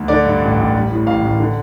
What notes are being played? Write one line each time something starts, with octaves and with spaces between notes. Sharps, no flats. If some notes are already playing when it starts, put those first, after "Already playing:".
Already playing: D2
D3 D5
G2
A1
A1
G3
A2
A1 F5
A1
D3